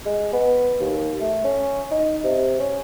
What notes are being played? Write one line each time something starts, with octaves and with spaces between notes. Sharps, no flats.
G#3
B3
D#2
A3
C#4
D#4
C3
C#4